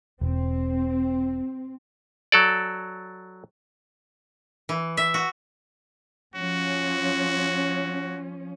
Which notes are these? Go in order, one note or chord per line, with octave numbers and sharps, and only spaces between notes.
E1 C4
F#3 A4 D5
E3
E5
F#4
F3 C#4 F#4